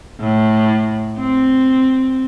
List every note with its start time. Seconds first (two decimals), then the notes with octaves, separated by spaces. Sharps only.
0.20 A2
1.18 C4